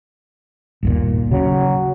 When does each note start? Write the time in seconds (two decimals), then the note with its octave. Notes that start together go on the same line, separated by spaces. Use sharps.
0.83 G1 D#2 A#2
1.32 C#3 F#3